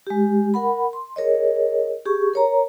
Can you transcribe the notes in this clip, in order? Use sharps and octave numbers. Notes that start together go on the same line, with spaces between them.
G#3 G4
A#4 F#5 B5
C6
G#4 A#4 C#5 D#5
G4 G#4 C#6
A#4 C#5 A#5